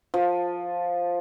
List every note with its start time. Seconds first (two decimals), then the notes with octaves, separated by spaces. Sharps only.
0.14 F3